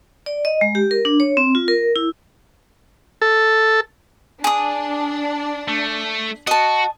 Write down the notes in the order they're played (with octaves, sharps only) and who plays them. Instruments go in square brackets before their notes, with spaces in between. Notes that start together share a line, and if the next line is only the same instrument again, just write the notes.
[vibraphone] D5
D#5
G#3
G4
A#4
D4
C#5
C4
F4
A#4
E4
[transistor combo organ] A4
[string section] D4 [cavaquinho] G#4 D#6
[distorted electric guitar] A3
[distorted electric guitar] F#4 [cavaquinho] D#5 A5